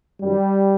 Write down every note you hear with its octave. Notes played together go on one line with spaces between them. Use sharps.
F#2 D#3 F#3 G3